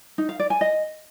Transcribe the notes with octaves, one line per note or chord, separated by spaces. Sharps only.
D#4
F5
D5
G#5
D#5